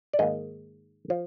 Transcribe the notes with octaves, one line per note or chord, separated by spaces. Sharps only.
D5
G#2 D#3 A#3 D#5
F3